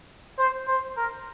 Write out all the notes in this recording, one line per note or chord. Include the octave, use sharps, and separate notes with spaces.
C5
C5
A#4